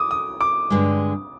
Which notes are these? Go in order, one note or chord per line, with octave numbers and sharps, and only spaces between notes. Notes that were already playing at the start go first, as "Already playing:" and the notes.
Already playing: D6 D#6
D#6
D6
G2 D3 G#3